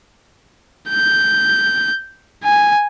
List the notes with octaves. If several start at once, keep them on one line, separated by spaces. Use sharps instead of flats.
G6
G#5